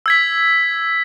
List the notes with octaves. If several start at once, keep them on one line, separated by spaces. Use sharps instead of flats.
E6 G#6 B6